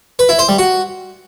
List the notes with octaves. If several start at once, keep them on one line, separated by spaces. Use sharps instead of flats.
B4
E4
C5
G3
F#4